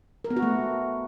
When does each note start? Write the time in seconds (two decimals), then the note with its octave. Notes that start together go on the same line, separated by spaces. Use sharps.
0.24 A#4
0.30 B3
0.36 F#4
0.42 A3